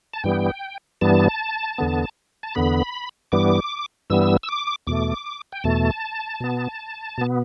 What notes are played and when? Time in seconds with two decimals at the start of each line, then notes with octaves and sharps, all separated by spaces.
0.13 A5
0.24 G2 E3 G3 B3 G5
1.01 G2 E3 G3 B3 A5
1.78 E2 D3 B3
2.43 A5
2.55 E2 D3 B3 B5
3.32 G2 E3 G3 B3 D6
4.10 G2 E3 G3 B3 E6
4.43 E6
4.49 D6
4.87 E2 B2 A3 D6
5.52 G5
5.64 E2 B2 A3 A5
6.40 B2 B3
7.18 B2 B3